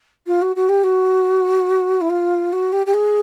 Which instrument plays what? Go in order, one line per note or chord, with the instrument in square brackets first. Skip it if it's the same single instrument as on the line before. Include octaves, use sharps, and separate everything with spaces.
[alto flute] F4
F#4
F#4
G4
F#4
E4
F4
F#4
G4
G4
G#4